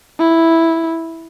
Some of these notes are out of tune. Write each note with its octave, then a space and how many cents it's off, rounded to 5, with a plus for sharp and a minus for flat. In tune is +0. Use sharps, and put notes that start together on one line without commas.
E4 -5